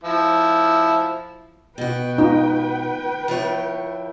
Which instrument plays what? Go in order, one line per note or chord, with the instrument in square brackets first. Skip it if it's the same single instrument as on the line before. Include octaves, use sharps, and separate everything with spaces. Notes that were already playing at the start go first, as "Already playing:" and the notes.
[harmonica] F3 E4
[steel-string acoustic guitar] B2 F#4 [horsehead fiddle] B4 G5
[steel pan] D#4 F4
[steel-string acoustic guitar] F3 E4 C#5